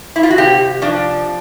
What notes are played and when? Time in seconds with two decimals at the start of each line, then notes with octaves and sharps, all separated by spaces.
0.16 E4
0.23 F4
0.30 F#4
0.38 C3 G4
0.82 F3 D4